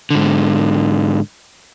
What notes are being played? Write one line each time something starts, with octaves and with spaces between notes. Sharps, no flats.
G#2 D3